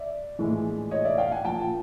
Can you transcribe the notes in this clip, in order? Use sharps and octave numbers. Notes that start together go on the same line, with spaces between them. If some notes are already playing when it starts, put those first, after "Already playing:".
Already playing: D5 E5
A#1 A2 E3 G#3
C#5 D#5
D5 E5
F5 G5
F#5 G#5
A#1 A#2 F3 G5 A5